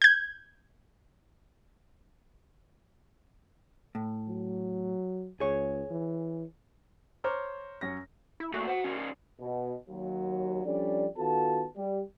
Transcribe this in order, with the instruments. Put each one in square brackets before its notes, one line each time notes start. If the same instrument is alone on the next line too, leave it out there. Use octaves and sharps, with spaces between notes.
[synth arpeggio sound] G6 G#6
[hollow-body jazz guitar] A2
[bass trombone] F#3
[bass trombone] C#2 [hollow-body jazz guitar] G#4 C#5
[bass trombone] E3
[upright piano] C5 C#5 A#5 D6 F6
F#2 C#4 C#5 A#6
[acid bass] E4
[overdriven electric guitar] A#2 A3 [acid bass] F#4
[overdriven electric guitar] C5 F#5
D#3 C#4
[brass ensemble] B2
D#2 F#3
F3 G3 C#4 D4 A4 D5
D#3 B3 F4 F#4 A4 A5
G3